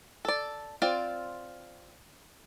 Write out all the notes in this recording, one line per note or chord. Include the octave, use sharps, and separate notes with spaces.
A4 D5
C4 F4 D5